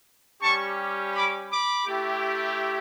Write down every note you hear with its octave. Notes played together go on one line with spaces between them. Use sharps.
G3 C#4 G4 A5 C#6
B5 D6
B5 D6
A3 E4 G4